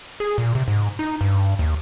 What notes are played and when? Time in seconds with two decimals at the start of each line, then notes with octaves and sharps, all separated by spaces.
0.20 G#4
0.38 A#2
0.55 C3
0.68 G#2
0.99 D#4
1.21 G2
1.59 D#2